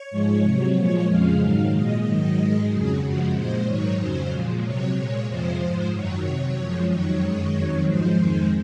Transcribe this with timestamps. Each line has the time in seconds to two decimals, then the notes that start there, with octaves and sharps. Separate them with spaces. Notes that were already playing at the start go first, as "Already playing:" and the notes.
Already playing: C#5
0.11 G#2 F3 G#3
0.43 C3 F#3
0.75 A#2 F3 G#3 C#5
1.07 F2 C#3 F3 G#3 F5
1.39 G#2 D#3 F#3 F5
1.72 A#2 G#3 D#5
2.04 G#2 D#3 F#3 D#5
2.37 G#2 D#3 G#3
2.69 F2 C#3 F#3 G#4
3.01 F#2 C#3 F3 G#3 F#4
3.34 A#2 G#3 C5
3.66 G#2 D#3 F#3 C#5
3.98 F2 C#3 F#3 C5
4.30 A#2 F3 G#3
4.63 C3 F#3 C#5
4.95 A#2 G#3 C#5
5.27 F2 C3 F3 G#3 C5
5.60 G#2 F3 G#3
5.92 F#2 D#3 F#3 C#5
6.25 C3 F#3
6.57 F#2 F3 G#3
6.89 F2 D#3 F#3 C#5
7.21 F#2 D#3 G#3
7.54 F2 D#3 F#3
7.86 G#2 F3 G#3 C5
8.18 F2 D#3 G#3